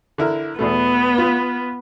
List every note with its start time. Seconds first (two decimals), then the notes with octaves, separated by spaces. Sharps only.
0.18 D3 E4 A#4
0.59 E2 B2 A3 B3
1.18 F4